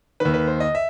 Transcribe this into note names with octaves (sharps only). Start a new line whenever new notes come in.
D#2 D#3 B4
B4
C5
D#5
E5